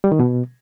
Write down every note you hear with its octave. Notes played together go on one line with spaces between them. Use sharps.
G3
D#3
B2